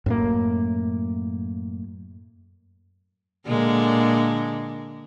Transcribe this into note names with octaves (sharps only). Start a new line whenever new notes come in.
F#2 A2 A#3
A#2 D3 G#3